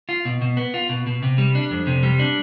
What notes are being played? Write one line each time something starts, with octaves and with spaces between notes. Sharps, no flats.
F4
B2
B2
B3
F4
B2
B2
C3
G3
D4
F2
C3
G3
D4